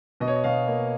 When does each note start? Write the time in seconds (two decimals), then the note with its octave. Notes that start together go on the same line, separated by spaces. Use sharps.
0.20 B2 D#5
0.28 C#5
0.35 D#5
0.44 B2 F5
0.67 A#3